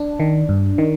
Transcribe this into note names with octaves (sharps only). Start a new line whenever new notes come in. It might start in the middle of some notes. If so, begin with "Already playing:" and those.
Already playing: D4
D#3
G2
D#3